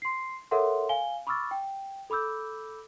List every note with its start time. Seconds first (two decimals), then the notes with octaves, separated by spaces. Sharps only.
0.02 C6 C7
0.51 A4 A#4 C#5 E5 F#5 C6
0.89 F5 G#5 G7
1.27 B5 C#6 D6 E6 F6 A6
1.51 G5
2.10 A4 B5 D6 E6 G6